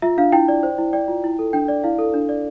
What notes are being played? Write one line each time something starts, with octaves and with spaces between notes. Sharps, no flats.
F4 E5
D4 F5
E4 G5
D5
C5
E4
D5 G5
F4
E4
A4
D4 G5
D5
E4 F5
A4
D4
D5